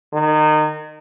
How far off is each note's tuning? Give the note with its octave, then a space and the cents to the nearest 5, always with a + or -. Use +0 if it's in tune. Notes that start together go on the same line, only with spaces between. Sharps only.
D#3 -25